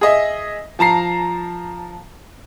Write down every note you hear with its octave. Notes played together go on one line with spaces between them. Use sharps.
G#4 D#5 E5
F3 A5 A#5 C7